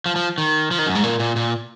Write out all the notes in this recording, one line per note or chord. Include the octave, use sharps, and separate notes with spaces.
F3
F3
D#3
F3
D#3
F#2
G#2
A#2
A#2
A#2